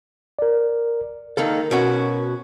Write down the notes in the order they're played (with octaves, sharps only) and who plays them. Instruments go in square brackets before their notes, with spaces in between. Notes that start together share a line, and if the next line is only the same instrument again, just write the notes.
[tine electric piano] A#4 D5
[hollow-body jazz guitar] D#3 A#3 A4 [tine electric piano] A#4
[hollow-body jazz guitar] B2 C#4 F#4